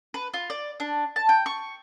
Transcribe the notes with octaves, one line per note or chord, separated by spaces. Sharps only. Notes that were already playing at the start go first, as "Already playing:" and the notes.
B4
F4
D5
D4
A5
G5
C#6